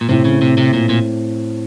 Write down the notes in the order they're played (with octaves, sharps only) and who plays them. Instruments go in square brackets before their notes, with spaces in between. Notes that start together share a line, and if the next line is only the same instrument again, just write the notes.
[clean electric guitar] A#2
[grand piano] A2 A3 C4 [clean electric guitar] C3
[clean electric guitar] C#3
C3
C3
A#2
A#2